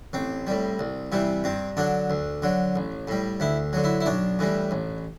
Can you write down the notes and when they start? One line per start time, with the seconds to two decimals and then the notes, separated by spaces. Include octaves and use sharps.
0.13 A1 C4
0.47 A2 G3
0.79 C2
1.12 C3 E3 G3
1.44 G2 C4
1.77 D3 F#3 D4
2.10 D2
2.42 D3 F#3
2.76 A1
3.08 A2 G3
3.40 D2 E4
3.73 D3 F#3
3.84 E4
4.01 E4
4.06 B1 D4
4.39 A2 E3 G3
4.71 A1